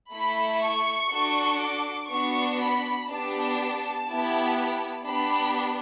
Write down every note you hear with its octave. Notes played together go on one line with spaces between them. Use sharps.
A3 E4 A4 B5
C#6
D4 F#4 A4
D6
B3 D4 F#4 C#6
B5
B3 D4 G4 A5
B3 E4 G4
B3 D4 G4 B5